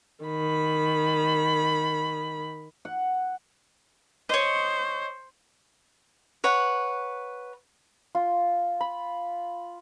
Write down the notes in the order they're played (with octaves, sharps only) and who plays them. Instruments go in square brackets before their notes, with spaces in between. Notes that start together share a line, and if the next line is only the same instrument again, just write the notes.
[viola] D#3 B5
[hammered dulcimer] F#5
[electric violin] C5 [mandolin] C#5 D#5
[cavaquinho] B4 C#5 F#5
[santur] F4
B5